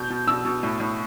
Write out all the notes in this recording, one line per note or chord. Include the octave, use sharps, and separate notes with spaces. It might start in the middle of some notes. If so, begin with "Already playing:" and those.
Already playing: B2 G6
B2
B2 E6
B2
A2
A2